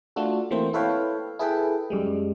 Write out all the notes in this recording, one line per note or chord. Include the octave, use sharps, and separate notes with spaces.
A3 D4 F4 F#4 A4
E3 A3 A#3 C4 E4 C5
E4 A4 B4 C#5 F5 G5
E4 G#4 A4 B4 E5 G5
F#2 G3 G#3